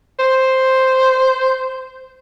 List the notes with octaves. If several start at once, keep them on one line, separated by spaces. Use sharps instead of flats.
C5